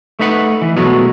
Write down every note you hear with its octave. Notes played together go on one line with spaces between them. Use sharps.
A3 D#4 B4 F#5
E3
B2 F#3 G#3 A3 B3